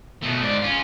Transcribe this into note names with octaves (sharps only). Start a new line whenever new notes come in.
B2 A3
G#2 D5
C#4 F4